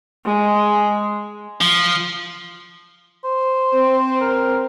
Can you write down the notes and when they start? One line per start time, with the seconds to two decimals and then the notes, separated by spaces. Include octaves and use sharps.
0.25 G#3
1.61 F3
3.24 C5
3.73 C4
4.21 A#4